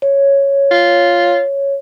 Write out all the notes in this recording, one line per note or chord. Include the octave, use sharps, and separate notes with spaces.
C#5
F4